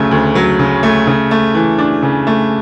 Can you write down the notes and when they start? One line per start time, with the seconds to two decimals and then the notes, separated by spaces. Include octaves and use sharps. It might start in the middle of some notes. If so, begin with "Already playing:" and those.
Already playing: D2 C#3 F#3 A3
0.11 D2
0.35 F#3
0.59 C#3
0.83 A3
1.07 C#3
1.31 A3
1.55 E3
1.78 D4
2.03 C#3
2.27 A3